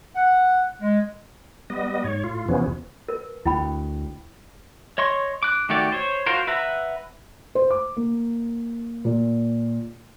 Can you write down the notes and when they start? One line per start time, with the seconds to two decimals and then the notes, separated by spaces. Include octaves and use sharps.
0.15 F#5
0.81 G#3
1.70 G3 B3 D#5
2.04 G#2 C#5
2.24 A2 F4
2.48 E2 C3 E3 F3 B3 C#4
3.09 A#4 B4
3.45 D2 E4 G5 B5
4.98 C#5 D#5 C6 C#6
5.43 D6 F#6
5.69 D#3 A3 F#4 G4 D5
5.92 C5 C#5
6.26 F4 F#4 A#4 C5
6.47 B4 E5 F#5 A#5
7.55 C5
7.70 D6
7.97 A#3
9.05 A#2